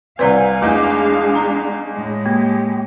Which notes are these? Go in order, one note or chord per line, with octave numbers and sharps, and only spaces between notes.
C2 C4 B4 D5 F5 G#5 A#5
E2 G#3 A3 D4 D#4 D6
A#5
A2 G#3
A#3 G4